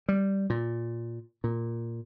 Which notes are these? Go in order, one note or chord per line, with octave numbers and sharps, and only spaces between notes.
G3
A#2
A#2